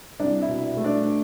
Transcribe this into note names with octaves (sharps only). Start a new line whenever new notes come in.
C2 D4 D5
E4 E5
B2
A3
D4 D5